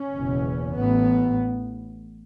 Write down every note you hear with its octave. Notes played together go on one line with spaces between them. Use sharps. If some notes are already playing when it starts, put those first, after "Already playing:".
Already playing: C#4
F#1 E2 B2
A1 A2 B3